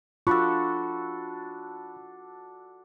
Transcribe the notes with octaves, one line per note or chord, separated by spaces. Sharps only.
D4 F4 F#4 A4 B5 C#6